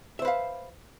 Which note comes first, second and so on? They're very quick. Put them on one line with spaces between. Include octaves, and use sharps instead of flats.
E5 C5 B4 F5